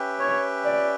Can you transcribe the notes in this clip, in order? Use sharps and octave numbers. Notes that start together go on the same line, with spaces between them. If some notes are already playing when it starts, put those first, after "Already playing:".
Already playing: C#4 G4 B4 E5 G5
C#5
D5